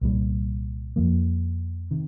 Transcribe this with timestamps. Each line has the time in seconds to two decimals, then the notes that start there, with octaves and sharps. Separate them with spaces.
0.01 C2 A#2 G3
0.96 F2 F3 A#3
1.91 C3 D#3